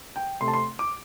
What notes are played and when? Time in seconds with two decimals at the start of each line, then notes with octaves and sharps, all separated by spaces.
0.16 G5
0.40 C3 A3 C4 C6
0.48 A5
0.54 C6
0.79 D6